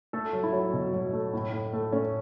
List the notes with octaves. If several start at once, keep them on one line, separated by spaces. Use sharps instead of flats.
A3 A4
F#3
E4
F#3
B2
F#3
A3
A2
A2
A3
A3 C#4